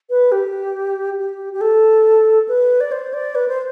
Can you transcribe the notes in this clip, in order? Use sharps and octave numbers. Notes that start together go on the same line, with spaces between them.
B4
G4
G4
G4
A4
B4
D5
C5
D5
B4
C5